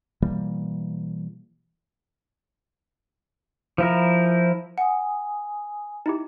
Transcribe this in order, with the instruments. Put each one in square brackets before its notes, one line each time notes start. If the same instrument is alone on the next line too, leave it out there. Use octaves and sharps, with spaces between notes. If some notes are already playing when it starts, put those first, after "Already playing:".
[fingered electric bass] B2 E3 G3 A#3
[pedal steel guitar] F3 E4 A#4
[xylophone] F#5 [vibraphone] G#5 D#6
[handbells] D#4 E4 G4